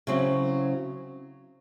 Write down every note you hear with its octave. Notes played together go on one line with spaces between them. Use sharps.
C#3 F#3 C4 E4